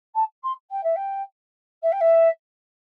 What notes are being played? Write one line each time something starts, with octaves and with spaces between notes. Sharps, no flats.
A5
C6
G5
E5
G5
E5
G5
E5